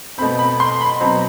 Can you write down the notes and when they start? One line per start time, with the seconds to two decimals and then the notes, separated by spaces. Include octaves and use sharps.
0.18 B2 A3 C4 B5
0.39 B5
0.60 C6
0.81 B5
1.01 B2 F#3 C4 B5